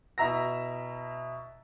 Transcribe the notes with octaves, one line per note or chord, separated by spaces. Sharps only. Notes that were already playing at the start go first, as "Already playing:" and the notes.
B2 E4 E5 A#5 E6 A#6